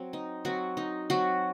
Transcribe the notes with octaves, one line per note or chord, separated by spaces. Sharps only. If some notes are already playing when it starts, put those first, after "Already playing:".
Already playing: F#3 C4
D#4
F#3 C4 F#4
D#4
F#3 C4 F#4